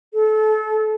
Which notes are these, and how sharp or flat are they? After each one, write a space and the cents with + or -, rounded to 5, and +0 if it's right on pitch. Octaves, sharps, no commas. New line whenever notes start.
A4 -30